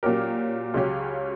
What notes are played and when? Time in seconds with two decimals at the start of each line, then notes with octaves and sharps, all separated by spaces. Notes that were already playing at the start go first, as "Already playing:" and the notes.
0.03 A#2 F#3 C#4 G4 A#4
0.74 C#2 C#3 F#3 C#4 G4